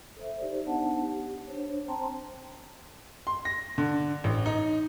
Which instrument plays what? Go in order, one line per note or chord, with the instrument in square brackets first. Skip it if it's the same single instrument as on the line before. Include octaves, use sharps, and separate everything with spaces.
[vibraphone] A4 C5 E5
D#4 G4 C5 D5
B3 D4 D#4 F#5 A5
G4
D4 C5 C#5
C4 C5 G5 A5 A#5 C6
[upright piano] C6
A#6
D3
A1
D#4